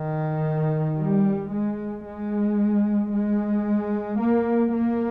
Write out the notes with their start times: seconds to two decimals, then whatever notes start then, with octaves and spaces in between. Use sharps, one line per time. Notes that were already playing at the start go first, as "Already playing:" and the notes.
Already playing: D#3
0.98 G3
1.52 G#3
2.06 G#3
3.13 G#3
4.20 A#3
4.74 A#3